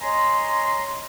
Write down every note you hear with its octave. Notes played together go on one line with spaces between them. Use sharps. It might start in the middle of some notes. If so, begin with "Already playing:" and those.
C#5 D#5 G#5 A#5 C6